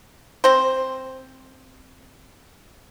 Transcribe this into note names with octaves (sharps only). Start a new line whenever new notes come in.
C4 C5